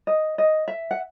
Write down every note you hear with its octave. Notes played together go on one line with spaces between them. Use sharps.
D#5
D#5
E5
F#5